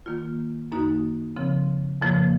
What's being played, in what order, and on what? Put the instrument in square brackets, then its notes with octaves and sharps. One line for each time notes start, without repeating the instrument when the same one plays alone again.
[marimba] D#3 A#3 F4
F#2 D#3 A#3 D#4 F#4
C#3 F3 C4
F2 C#3 F3 A#3